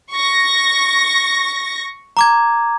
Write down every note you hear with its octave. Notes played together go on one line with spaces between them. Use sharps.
C#6 A#6
A#5 D6 G#6